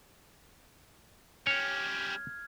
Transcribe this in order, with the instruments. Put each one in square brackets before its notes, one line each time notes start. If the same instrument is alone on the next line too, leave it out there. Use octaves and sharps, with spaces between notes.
[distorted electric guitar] G3 C#4 [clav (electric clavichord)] C#5 [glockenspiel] F6 G#6